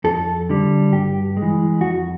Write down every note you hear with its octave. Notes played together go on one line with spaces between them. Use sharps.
F2 A4
D3 G3
G2 G4
G#3
E3
F2 F#4